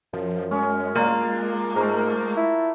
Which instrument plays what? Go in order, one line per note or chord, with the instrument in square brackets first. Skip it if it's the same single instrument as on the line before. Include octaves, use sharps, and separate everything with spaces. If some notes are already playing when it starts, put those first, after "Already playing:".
[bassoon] F#2 [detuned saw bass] F3
[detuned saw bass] G#3 [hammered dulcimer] C#4
[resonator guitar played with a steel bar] A#3 [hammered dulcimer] D4 F4
[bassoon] G#2 [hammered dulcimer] A3 A#4
[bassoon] E4